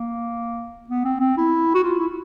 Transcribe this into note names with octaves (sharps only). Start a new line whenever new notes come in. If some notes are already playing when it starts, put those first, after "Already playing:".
Already playing: A#3
B3
C4
C4
E4
F#4
F4
E4